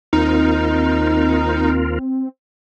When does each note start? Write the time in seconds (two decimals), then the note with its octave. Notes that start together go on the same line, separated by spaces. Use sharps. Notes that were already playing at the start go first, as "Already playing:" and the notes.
0.13 D#2 C4 D#4 F4 A#4